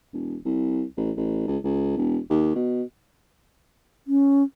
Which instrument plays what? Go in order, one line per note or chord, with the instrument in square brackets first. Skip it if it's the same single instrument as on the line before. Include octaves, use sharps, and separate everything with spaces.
[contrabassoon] E1
C2
A1
A1
C#2
C#2
E1
D#2
B2
[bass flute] C#4